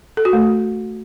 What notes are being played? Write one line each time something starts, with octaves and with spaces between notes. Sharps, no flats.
A4
F#4
A3